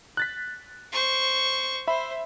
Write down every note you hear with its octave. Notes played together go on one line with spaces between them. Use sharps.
F#6 A6 B6
C5 C#6
C5 E5 B5